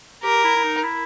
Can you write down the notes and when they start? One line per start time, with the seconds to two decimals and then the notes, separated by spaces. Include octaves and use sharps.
0.23 G4 A#4
0.44 E4
0.56 E4
0.64 D#4
0.84 E4